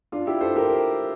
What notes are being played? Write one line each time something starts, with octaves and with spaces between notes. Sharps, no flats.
D4 F4
E4 G4
A4 C5
G4 A#4